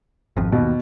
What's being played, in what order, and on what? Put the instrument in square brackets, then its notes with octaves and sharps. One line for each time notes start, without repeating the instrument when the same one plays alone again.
[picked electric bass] G#1 F2
[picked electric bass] D#2 [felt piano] B2